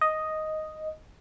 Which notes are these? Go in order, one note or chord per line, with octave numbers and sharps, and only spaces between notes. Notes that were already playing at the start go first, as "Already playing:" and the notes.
D#5